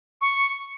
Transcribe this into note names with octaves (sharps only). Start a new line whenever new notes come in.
C#6